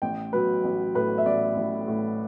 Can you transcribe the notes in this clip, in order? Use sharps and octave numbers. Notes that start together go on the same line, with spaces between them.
A1 G5
F#3 B4
A1
A2 B4
E5
A1 D5
A1
A2